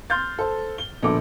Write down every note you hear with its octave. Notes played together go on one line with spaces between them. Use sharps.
C6 F6 G6 A6
A4 C5
G7
A#1 B2 D3 A4 D6